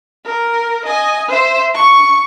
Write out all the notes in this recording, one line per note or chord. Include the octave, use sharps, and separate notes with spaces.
A#4
D#5 G#5
C5 E5
C#6